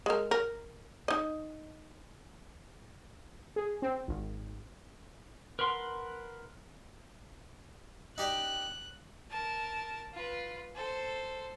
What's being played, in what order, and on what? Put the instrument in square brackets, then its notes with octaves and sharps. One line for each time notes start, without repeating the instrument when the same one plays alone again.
[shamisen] G#3 A#4
A#4
D#4 D#5
[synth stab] G#4
C4
G#1
[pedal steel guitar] A#4 B4 F#5 C6
[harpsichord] D#4 G4 D5 [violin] F#6
[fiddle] A#4 A5
F4 B4
A4 C5